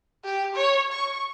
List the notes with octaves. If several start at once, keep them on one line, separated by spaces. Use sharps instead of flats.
G4
C#5
C#6